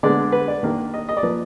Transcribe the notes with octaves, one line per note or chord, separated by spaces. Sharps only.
D3 G#3 B3 D4 D5
B4
D5
D#3 A#3 D4
D#5
D#5
D5
F3 A#3 B4